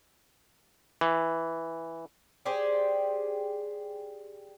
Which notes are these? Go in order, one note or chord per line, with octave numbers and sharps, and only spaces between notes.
E3
G4 G#4 C5 D5